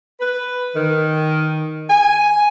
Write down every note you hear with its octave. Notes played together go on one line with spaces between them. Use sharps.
B4
D#3
G#5